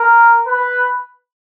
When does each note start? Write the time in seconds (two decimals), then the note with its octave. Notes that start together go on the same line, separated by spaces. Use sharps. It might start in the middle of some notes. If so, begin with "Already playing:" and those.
Already playing: A#4
0.47 B4